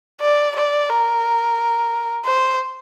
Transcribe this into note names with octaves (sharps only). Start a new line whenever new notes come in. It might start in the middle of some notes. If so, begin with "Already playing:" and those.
D5
D5
A#4
C5